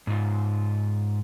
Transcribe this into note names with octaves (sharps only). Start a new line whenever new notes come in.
G#2 F4